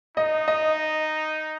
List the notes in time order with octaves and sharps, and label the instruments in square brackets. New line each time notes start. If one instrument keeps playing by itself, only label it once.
[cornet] D#4 [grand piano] D#5
[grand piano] D#5